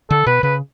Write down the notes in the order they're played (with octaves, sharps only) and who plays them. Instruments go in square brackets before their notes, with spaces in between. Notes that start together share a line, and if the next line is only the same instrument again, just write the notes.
[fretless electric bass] D3 [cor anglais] A4
[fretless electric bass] B2 [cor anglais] B4
[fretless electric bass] C#3 [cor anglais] B4